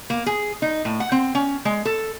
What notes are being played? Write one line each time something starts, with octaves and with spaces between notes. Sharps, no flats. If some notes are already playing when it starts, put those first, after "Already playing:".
A#3
G#4
D#4
A2
F#5
C4
C#4
G#3
A4